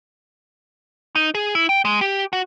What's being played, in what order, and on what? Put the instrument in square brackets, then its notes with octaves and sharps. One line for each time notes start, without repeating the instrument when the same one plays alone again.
[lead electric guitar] D#4
G#4
E4
G5
G#3
G4
F#4